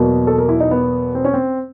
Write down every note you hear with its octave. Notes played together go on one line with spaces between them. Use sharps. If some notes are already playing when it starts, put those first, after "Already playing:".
Already playing: E2 B2 F#3 A#3
A4
A#4
E4
D#4
B3
C4
C#4
C4